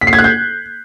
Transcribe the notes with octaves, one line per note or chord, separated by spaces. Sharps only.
B6
C7
G#6
F#6
G6